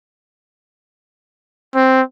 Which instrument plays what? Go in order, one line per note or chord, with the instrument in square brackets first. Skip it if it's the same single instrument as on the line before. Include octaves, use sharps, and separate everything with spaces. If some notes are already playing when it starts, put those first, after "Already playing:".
[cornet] C4